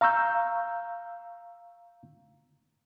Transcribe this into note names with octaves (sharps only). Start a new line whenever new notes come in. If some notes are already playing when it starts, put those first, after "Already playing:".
F5 A#5 C#6 E6 G6